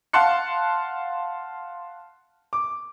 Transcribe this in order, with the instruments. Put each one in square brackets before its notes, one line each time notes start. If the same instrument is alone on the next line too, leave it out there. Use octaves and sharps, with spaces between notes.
[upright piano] F5 F#5 A5 C6 F#6 C#7
D6